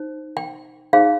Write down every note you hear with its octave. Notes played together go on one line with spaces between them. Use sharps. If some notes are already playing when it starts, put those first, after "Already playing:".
Already playing: D#4 C5
G5
D#4 G#4 C5 F5